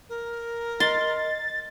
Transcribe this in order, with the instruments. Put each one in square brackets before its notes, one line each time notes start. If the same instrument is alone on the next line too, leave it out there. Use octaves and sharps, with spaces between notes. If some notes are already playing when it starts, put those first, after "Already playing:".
[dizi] A#4
[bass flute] D#5 [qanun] C6 [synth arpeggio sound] A6